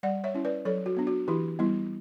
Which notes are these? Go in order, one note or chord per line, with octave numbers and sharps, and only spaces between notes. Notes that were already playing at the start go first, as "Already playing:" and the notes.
G3 D5 F#5
C#5 E5
C#4 E4
B4 D5
F#3 A4 C#5
F#4
B3 D4
F#4
E3 E4 G4
G3 B3 E4